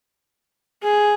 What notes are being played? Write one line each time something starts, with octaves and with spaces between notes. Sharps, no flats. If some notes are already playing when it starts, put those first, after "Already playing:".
G#4